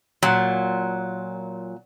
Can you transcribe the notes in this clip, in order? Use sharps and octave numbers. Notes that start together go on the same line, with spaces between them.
A#2 F#3